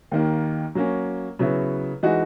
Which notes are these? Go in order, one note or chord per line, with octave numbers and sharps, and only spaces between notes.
D#2 D#3 A#3
F#3 A#3 C#4
C#3 F#3 B3 E4
E3 G#3 D#4 F#4